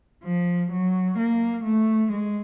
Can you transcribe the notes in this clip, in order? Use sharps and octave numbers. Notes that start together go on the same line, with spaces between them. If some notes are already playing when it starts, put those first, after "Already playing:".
F3
F#3
A#3
A3
G#3